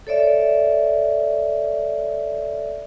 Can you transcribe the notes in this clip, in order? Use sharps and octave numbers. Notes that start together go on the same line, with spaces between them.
A4 C#5 D5 E5